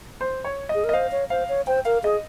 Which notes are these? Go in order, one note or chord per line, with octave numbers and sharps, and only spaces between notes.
C5
C#5
D#5
G#4
A#4
D#5
C5 F5
C#5
C5 F5
C#5
C5 G5
A#4 F5
G#4 D#5